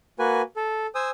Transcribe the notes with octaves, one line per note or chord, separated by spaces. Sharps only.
A#3 F#4 B4 G#5
A4
C5 G#5 D#6 E6